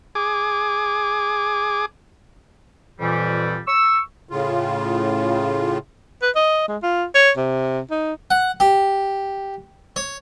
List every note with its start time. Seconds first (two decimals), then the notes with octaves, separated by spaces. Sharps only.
0.15 G#4 D6
3.00 F2 A#2 E3 G3
3.67 C#6 E6
4.29 A2 C#3 F4
6.22 B4
6.35 D#5
6.68 G#3
6.83 F4
7.15 C#5
7.37 C3
7.90 D#4
8.31 F#5
8.60 G4
9.96 C#5